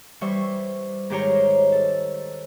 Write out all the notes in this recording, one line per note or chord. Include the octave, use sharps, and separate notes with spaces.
E3 G3 C5 E5 C#6
G#2 D#3 G4 C5 C#5 A#5
A4